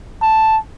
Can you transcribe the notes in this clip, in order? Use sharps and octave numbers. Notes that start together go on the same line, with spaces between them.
A5